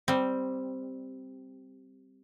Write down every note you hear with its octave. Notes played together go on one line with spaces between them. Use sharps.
G3 C4